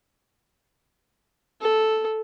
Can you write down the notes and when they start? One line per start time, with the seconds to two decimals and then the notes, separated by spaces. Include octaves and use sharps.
1.61 A4